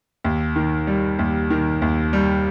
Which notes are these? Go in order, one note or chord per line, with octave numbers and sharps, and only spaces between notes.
D#2
D#3
G3
D#2
D#3
D#2
G3